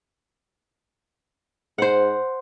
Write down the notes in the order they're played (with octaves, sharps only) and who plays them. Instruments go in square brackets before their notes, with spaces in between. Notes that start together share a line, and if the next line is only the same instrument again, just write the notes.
[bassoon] G#2 [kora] C5 F#5